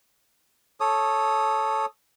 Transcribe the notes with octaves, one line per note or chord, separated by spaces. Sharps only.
A4 C#5 D#6